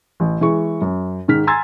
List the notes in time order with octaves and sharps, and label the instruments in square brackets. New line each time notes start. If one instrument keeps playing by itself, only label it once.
[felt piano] A1
E3 G#3 C#6
F#2
G#2 D#3 F6 B6
G#5 A#5 C6 E6 G#6 A6